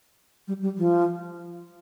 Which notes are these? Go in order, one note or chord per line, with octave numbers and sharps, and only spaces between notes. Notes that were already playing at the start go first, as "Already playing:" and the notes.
G3
G3
F3